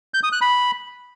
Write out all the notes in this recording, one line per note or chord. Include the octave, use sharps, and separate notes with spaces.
G6
D#6
F#6
B5